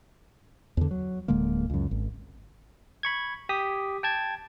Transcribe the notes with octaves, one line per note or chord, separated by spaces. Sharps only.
E2 D3
F#3
D1 D3 G#3 A#3
C#2 F#2
G#1
B5 C#6 G#6
G4 D#6 B6
G5 A5 G#6